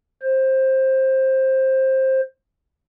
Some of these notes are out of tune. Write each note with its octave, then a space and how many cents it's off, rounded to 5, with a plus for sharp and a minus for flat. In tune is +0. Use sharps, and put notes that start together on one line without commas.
C5 +15